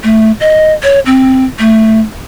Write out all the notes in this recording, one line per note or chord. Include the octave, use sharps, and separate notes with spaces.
A3
D#5
C#5
C4
A3